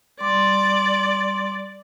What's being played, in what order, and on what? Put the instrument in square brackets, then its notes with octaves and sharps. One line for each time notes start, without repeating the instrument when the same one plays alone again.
[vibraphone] G3 C6 D6 [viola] D5